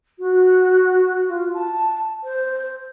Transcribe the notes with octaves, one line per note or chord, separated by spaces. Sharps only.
F#4
F4
A5
C5